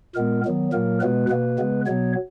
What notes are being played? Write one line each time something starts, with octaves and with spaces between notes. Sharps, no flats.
A#2 G#3 B3 A#4
D#3 F#3 B3
A#2 F#3 A#3 A#4
B2 G#3 B3 B4
B2 A#3 B4
C#3 G#3 B3
B2 F#3 B3 C#5